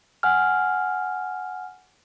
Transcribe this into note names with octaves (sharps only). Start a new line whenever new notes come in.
F#5 G#5 F6